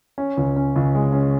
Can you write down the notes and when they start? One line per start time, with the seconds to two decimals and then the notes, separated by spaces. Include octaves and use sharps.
0.18 C#4
0.37 C#2
0.56 C#4
0.76 C#2
0.95 G#3
1.13 C#4